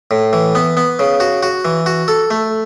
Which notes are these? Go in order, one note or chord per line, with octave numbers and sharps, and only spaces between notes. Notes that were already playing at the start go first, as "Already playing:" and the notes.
A2
E3
B3
B3
C#3
F#4
F#4
E3
F#4
A4
A3